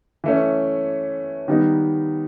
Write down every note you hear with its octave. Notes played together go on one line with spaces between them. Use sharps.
E3 A3 C#4
D#3 G3 B3 D#4